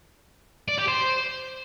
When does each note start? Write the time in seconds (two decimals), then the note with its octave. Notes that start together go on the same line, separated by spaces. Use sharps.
0.69 D5
0.78 G4
0.88 C5